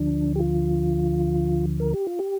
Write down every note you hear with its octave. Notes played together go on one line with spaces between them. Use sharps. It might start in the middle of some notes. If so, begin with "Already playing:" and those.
Already playing: D2 D3 F3 D4
G4
F4
A#4
G4
F4
G4